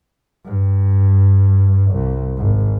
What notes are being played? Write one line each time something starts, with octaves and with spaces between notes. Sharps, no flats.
G2
C2
G#1